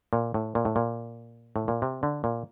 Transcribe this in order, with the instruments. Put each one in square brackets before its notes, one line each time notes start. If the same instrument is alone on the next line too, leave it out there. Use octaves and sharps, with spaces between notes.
[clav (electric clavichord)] A#2
A2
A#2
A2
A#2
A2
A#2
C3
D3
A#2